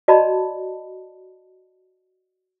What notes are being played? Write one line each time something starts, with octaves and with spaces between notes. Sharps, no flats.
F#4 D5 D#5 A5 B5